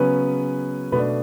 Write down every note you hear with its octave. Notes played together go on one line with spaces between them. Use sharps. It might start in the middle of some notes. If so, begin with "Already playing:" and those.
Already playing: C#3 F#3 B3 C#4 B4
B2 A3 B3 D4 B4